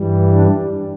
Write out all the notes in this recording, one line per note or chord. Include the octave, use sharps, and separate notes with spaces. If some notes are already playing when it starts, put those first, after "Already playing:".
Already playing: G2 E3 G3
D4